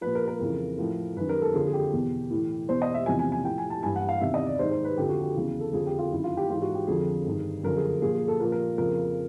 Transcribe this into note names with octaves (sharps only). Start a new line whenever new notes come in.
A#2 F3 B4
A#4
A#4
F2 C#3 E3
A2 F3
F#2 D#3 B4
A#4
A4
F2 D3 F3 G#4
G#4
G4
E2 B2
A2 E3
E2 B2 C5
D#5
E5
E2 C3 F3 G#5
G#5
G#5
A2 F3 G5
G#5
A5
G2 E3 G#5
F#5
F5
E2 C3 D#3 E5
D#5
D5
G#2 D#3 C5
C5
B4
F2 D3 F3 G4
F#4
G4
E2 C#3 E3
A4
F2 D3 F3 G#4
G4
F4
F#2 D#3 E4
F4
G4
G#2 E3 F4
F#4
G4
F2 D3 F3 G#4
G2 D#3
F#2 D3 F3 A#4
G#4
A#2 F3 G#4
G#4
A4
A#2 F3 A#4
A#4
F2 C#3 F3 A#4